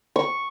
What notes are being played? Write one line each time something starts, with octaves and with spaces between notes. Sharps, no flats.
C#6